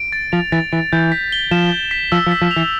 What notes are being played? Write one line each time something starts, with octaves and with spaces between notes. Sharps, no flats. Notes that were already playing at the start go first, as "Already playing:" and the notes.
Already playing: D7
A6
F3 F7
E3 A6
E3 D7
E3 G6
B6
G7
F3 E7
G6
B6
F3 E6
F3
B6
F3
F7
E3